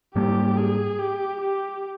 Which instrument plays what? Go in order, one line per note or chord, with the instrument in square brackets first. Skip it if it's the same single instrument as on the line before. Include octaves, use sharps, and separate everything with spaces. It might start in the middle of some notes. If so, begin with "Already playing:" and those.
[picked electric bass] G#2 G3 A#3 [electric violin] G4
[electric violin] G#4
G4
G4